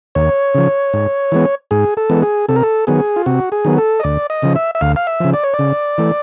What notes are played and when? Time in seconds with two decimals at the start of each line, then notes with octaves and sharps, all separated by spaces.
0.15 D#2 C#5
0.54 C#3 F3
0.93 G#2
1.32 E3 G#3 B3
1.71 G#2 G#4
1.97 A4
2.10 E3 G#3 B3
2.22 G#4
2.49 C3 A4
2.56 A#4
2.63 A4
2.87 D#3 F#3 B3 G#4
3.16 F4
3.26 C3 F#4
3.52 G#4
3.65 D#3 F#3 B3
3.78 A4
4.00 D#5
4.03 D2 D5
4.30 D#5
4.42 C#3 F3
4.56 E5
4.75 E5
4.81 D2 F5
4.96 F5
5.07 E5
5.20 C#3 F3
5.33 D5
5.43 C#5
5.54 D5
5.59 C#3
5.98 E3 A3